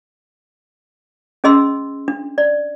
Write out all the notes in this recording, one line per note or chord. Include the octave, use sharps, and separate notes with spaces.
C#4 G#4 D#5 C6 E6
D4
D5